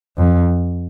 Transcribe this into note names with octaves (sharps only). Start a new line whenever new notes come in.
F2